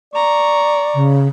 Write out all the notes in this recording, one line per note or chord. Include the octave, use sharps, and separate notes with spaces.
D5 A#5 C#6
C#3